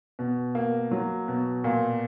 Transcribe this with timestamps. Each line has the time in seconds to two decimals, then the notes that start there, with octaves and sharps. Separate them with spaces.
0.19 B2
0.55 A#3
0.91 F#3
1.28 B2
1.64 A#2